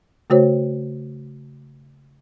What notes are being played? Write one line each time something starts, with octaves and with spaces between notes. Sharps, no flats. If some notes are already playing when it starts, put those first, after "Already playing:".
C#3 A3 F#4 C5 C#5